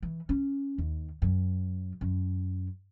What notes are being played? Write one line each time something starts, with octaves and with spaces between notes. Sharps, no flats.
E3
C#4
D#2
F#2
F#2